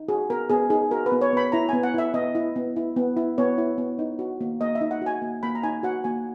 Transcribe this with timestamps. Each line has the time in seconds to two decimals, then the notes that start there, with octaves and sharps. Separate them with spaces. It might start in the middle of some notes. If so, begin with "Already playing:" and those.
Already playing: D#4
0.09 F#4 G#4
0.30 B3 A#4
0.50 B3 G#4
0.70 D#4 G#4
0.91 F#4 A#4
1.06 B4
1.12 B3
1.21 C#5
1.33 B3 B5
1.52 E4 A#5
1.69 B3 G#5
1.83 F#5
1.94 E4 E5
2.14 B3 D#5
2.35 E4
2.56 B3
2.76 E4
2.96 B3
3.17 E4
3.38 B3 C#5
3.58 E4
3.78 B3
3.99 D#4
4.19 F#4
4.41 A#3
4.61 A#3 D#5
4.75 E5
4.81 D#4
4.91 F#5
5.02 F#4 G#5
5.22 A#3
5.43 A#3 B5
5.55 A#5
5.63 D#4 G#5
5.83 F#4 F#5
6.04 A#3 G#5